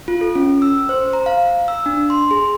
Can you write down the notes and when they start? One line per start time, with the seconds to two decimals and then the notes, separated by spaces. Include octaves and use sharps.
0.08 F4
0.21 A4
0.35 C#4
0.62 E6
0.89 C5
1.13 A#5
1.26 F5
1.68 E6
1.86 D4
2.10 C6
2.31 G#4